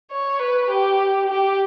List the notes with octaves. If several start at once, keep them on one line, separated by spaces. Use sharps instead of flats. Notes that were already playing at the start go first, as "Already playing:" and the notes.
C#5
B4
G4
G4